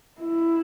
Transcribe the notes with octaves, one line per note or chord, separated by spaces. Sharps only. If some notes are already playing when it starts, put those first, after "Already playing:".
E4